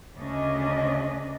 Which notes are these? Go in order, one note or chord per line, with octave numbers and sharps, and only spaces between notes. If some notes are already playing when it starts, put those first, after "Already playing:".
D2 C#3 A3 C#4 D4 D#5